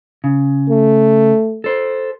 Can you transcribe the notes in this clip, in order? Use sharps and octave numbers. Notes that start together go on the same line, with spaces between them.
C#3
A3
A4 C5